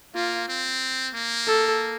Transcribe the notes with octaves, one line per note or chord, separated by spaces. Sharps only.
A#3 F4
C4
A#3
A4